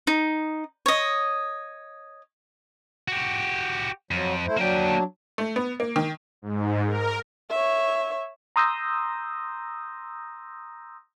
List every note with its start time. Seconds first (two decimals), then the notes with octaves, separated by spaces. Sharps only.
0.07 D#4
0.86 C#5 D#5
3.08 F#4 G4
4.11 F2 F#3
4.46 A3 E4 C5
4.57 F#3 A#3 D4 G5
5.38 A3
5.56 B3
5.80 A#3
5.96 D#3
6.42 G#2
6.87 A#4
7.50 C#5 E5
8.56 A#5 C6 D#6 E6 G6 A#6